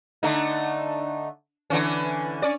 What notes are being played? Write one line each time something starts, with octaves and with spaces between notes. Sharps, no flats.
D3 A3 D#4
D3 E3 C#4
C#4 D5